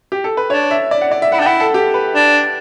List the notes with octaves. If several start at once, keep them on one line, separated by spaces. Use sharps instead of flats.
G4
A4
B4
D4 C#5
E5
D5
F#5
D5
E5
E4 F#5
D4 G5
E4 F#5
A4
G4
B4
D4